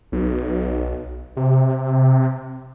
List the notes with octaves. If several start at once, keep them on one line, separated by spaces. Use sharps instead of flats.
B1
C3